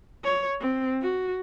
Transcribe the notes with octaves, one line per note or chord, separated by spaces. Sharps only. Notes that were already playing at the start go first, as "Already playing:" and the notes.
C#5
C4
F#4